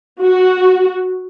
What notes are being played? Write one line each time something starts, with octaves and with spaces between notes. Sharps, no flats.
F#4